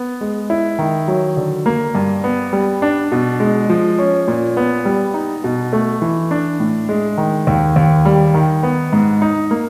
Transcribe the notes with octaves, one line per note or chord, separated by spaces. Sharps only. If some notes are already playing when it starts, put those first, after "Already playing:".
Already playing: B3
G#3
E4
D#3
F#3
D3
A#3
G2
B3
G3
D4
B2
G#3
F3
C#4
A#2
B3
G3
D#4
B2
A3
E3
D4
A2
G#3
D#3
D#2
D#2
G3
D#3
B3
G#2
D#4
A#3